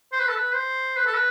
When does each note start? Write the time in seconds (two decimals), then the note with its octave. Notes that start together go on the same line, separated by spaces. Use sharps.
0.13 C5
0.20 B4
0.29 A4
0.36 B4
0.55 C5
0.97 B4
1.06 A4
1.14 B4